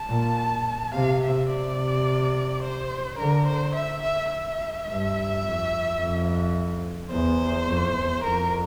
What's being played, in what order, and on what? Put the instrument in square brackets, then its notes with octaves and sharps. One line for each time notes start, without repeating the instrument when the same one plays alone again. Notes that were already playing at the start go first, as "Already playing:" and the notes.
Already playing: [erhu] A5
[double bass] A#2
[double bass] C3 [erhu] F5
[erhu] E5
[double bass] C3 [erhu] D5
[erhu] C5
[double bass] D3 [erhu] A#4
[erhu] C5
E5
E5
E5
[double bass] G2
F2
F2
[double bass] E2 [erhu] C5
[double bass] F2
E2
[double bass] F2 [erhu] A#4